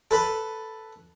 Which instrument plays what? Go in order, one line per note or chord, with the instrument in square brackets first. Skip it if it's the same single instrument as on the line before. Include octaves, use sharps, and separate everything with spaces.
[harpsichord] A4 B4 B5